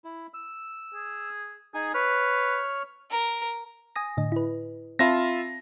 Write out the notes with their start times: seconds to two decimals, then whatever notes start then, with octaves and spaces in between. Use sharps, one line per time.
0.04 E4
0.34 E6
0.94 G#4
1.74 D#4 G#4 G#5
1.94 B4 C#5 F6
3.10 A#4
3.96 G#5 D#6 A#6
4.17 A2 D3 D#5
4.32 E4 B4
4.99 C4 F4 E5 A5 B5 A#6